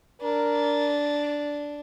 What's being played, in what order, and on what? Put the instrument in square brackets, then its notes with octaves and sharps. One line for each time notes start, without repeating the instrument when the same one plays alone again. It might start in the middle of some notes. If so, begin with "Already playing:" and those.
[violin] D4 [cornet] A#4